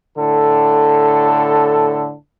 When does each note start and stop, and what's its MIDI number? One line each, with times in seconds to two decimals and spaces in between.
0.17 2.14 45
0.17 2.14 50
0.17 2.14 69